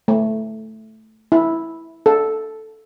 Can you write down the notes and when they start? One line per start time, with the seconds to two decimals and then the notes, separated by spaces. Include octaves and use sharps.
0.08 A3
1.32 E4
2.06 A4